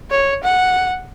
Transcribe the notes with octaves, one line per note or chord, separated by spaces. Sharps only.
C#5
F#5